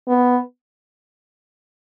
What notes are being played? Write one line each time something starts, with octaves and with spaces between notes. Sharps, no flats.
B3